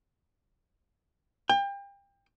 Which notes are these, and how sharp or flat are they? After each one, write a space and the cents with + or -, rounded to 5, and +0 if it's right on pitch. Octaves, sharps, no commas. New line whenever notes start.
G5 +30